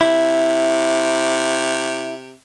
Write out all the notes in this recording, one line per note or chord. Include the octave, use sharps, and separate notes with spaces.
C3 E4